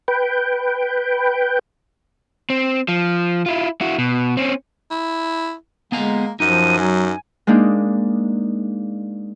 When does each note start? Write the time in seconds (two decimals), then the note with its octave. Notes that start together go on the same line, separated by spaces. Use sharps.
0.08 B4 G5
2.50 C4
2.88 F3
3.46 E4 F4
3.81 E4 F#4
3.98 B2
4.37 C4 C#4
4.91 E4
5.92 G#3 A#3 B3 G#5 A#5
6.40 F#2 F3 D#4 D#7
6.79 F#3 G#5
7.47 G#3 A#3 D4 D#4